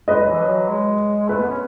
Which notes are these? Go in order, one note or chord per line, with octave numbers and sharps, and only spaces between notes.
G#3 B4 D#5
F#3
E3
F#3
G#3
A3 B4
B3
C#4